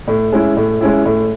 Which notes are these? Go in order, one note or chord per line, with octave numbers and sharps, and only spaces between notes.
A2
G#3 C#4 E4
A2
G#3 C#4 E4
A2